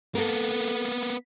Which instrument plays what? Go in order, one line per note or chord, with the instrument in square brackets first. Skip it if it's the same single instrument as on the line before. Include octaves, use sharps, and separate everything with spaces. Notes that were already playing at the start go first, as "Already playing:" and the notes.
[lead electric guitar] A#3 B3 [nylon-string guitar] A4 A#4